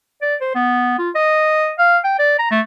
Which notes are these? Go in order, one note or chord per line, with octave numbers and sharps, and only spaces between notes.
D5
C5
B3
F4
D#5
F5
G5
D5
A#5
A3